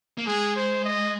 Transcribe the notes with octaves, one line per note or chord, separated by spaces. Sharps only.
A#3
G#3 G#4
C5
D#5